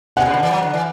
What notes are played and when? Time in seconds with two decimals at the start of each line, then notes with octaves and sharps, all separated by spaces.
0.17 B2 F#5
0.26 C#3
0.34 D3
0.43 E3
0.51 F#3
0.63 D3
0.74 E3